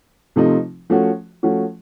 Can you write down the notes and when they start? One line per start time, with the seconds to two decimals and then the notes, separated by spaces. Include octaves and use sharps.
0.36 C3 F3 A3 C4 D#4
0.90 F3 A3 C#4 F#4
1.43 F3 A3 C#4 F#4